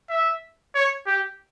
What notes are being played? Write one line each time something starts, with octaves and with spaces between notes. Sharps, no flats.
E5
C#5
G4